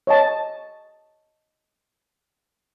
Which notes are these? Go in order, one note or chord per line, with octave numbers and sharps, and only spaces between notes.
C#5 D#5 A5